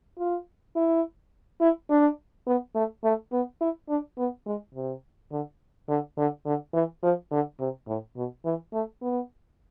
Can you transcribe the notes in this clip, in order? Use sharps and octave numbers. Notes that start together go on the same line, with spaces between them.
F4
E4
E4
D4
B3
A3
A3
B3
E4
D4
B3
G#3
C3
D3
D3
D3
D3
E3
F3
D3
C3
A2
B2
E3
A3
B3